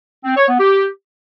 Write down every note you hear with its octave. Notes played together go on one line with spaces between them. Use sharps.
C4
C#5
B3
G4